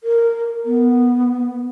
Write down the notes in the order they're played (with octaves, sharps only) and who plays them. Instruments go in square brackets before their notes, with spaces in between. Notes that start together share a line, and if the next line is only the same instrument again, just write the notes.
[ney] A#4
B3